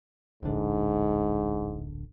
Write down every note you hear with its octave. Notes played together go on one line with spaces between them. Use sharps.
D1 A#1 G#2 D3